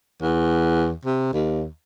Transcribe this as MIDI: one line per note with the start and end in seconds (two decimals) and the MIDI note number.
0.22 0.93 40
1.05 1.30 48
1.33 1.68 39